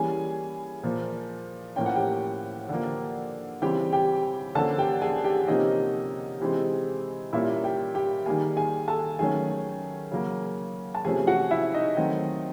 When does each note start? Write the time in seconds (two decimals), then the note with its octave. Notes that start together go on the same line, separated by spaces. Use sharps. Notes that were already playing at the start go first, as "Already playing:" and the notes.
Already playing: E3 G3 A#3 C#4 G#4 G#5
0.84 A#2 F3 A#3
1.76 A2 F3 A#3 C#4 G5
1.86 F#5
1.95 G4 G5
2.69 D3 F3 A#3
3.62 C#3 E3 G3 C4 G4 G5
3.93 G4 G5
4.55 D3 F3 A#3 C#4 A4 A5
4.78 G4 G5
5.02 G#4 G#5
5.24 G4 G5
5.47 C3 F3 A#3 C#4 D#4 D#5
6.40 C3 E3 G#3 C4
7.33 A#2 G3 A#3 C#4 E4 E5
7.64 G4 G5
7.95 G4 G5
8.26 D#3 G3 A#3 G#4 G#5
8.56 G#4 G#5
8.88 A4 A5
9.19 D#3 F#3 A3 C#4 G#4 G#5
10.12 C#3 F#3 A#3
10.95 A5
11.05 C3 F3 A3 C#4 G#4 G#5
11.27 F#4 F#5
11.51 E4 E5
11.73 D#4 D#5
11.97 D#3 F#3 A3 C4